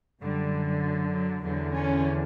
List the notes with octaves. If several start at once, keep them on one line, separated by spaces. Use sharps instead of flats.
F#2 D3 G3
F#3
F#3
E2 D3 F#3
C#4